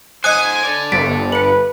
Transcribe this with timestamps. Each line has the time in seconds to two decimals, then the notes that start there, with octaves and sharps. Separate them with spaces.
0.24 C5 D#5 F#5 G#5 D#6 F#6
0.63 A4 D5
0.92 G1 A6 B6 D7
1.32 B4 C#7 F#7